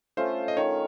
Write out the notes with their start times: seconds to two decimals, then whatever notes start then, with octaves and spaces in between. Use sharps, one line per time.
0.17 A3 C#4 F4 C5
0.48 D#5
0.57 D#3 C#5